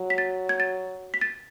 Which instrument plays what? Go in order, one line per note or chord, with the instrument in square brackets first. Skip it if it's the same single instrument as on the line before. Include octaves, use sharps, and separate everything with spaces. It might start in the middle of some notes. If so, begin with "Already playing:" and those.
Already playing: [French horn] F#3
[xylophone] B6
A6
G#6
A6
B6
A6